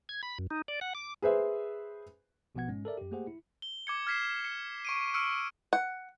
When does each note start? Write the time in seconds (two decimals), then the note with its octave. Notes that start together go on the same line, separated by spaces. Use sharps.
0.09 G#6
0.23 B5
0.39 F#2
0.51 D#4
0.68 D5
0.81 F#5
0.95 D6
1.22 G#4 B4 C5 E5
2.55 A1 B2 F3 B3 F#5 G#6
2.69 G#2 G#3 C#4
2.85 A4 A#4 D5 E5
2.97 F#2 G4
3.11 A3 A#3 G4 G#4 C5 F#5
3.27 E4
3.62 G7
3.87 D6 G#6 C#7
4.07 F6 G#6 B6 C7 E7
4.45 C#7
4.85 C#6 D7 D#7
5.14 C#6 E6 F6 C#7 D7
5.73 F#5